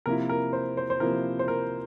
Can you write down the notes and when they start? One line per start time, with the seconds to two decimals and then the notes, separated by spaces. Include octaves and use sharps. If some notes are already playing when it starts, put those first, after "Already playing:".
0.06 C3 F3 A#3 E4 A#4
0.29 A#4
0.53 C5
0.77 C5
0.90 C5
1.00 C3 F3 A#3 E4 A#4
1.39 C5
1.48 A#4